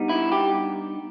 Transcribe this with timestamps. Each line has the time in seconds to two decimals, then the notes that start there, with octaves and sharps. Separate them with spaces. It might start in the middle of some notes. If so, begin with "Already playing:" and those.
Already playing: G2 G3 B3 D#4
0.09 E4
0.32 G4